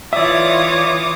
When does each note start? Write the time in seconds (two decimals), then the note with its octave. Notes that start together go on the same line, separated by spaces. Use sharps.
0.13 E3 F4 C#5 D5 E5 D6 D#6